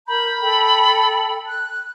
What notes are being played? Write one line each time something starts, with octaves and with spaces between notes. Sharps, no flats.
A#4 A#5 B5 G6
A4 G5
F#6